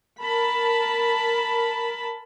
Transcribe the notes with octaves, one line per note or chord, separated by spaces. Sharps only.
A#4 A5 B5